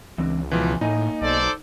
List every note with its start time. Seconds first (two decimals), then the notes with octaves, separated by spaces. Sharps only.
0.18 C#2 E3 C4 D4
0.51 B2 E3 F3 G#5
0.81 A2 A#3 D#4 D#5 G#5
1.21 B1 A4 C5 D5